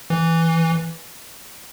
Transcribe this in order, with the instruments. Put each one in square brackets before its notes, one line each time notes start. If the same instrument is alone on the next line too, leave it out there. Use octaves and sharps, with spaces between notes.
[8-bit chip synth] E3